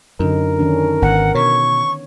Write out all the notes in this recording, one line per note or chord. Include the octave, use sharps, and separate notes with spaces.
F#2 D3 C#4 D#4 A#4
D#3 C#4 D4
G#1 B3 F#5
B2 C#5 C#6